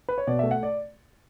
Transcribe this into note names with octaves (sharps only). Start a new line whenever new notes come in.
B4
C#5
B2 D5
A3 E5
F#5
D5